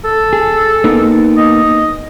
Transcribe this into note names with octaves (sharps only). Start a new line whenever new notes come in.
A4
G#4
A#3 B3 D#4
D#5